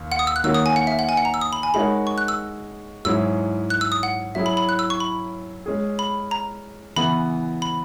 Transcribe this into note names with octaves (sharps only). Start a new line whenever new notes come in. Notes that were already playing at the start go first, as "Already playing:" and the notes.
Already playing: D#2
F#5
D#6
E6
F#6
D#3 A#3 C#4 F#4 E6
D#6
G#5
F#5
E5
F#5
G#5
F#5
A#5
E6
D#6
B5
G#5
G#3 D#4 F#4 A#4 C#5 B5
C#6
F#6
E6
G#2 F#3 C#4 E4 G#4 E6
F#6
E6
D#6
F#5
F#3 C#4 E4 G#4 E5
B5
B5
F#6
E6
C#6
B5
G#3 C#4 G#4
B5
A#5
C#3 E3 B3 B5
B5